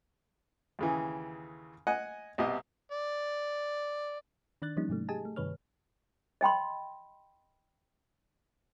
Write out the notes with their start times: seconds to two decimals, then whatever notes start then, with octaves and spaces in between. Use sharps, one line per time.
0.79 D#2 C#3 E3
1.87 D#5 F#5 G#5
2.38 C2 B2 G4 D#5
2.92 D5
4.62 D#3 D4 D5 F#6 A6
4.76 E3 F3 G3 A#3 C#4 D#4
4.89 G#2 C3 F#3 A3
5.09 G4 G#4 D#5 G#5 A5
5.25 A3
5.36 G2 C3 D#3 B4 C#5 F6
6.41 D#5 G5 B5 C6